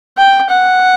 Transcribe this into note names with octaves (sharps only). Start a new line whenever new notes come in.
G5
F#5